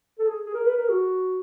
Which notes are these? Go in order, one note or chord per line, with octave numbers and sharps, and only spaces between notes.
A4
G#4
G#4
A#4
B4
A#4
F#4